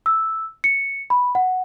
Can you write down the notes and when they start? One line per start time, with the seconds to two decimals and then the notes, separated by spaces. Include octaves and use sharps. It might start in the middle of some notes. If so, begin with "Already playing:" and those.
0.06 E6
0.64 C#7
1.10 B5
1.35 F#5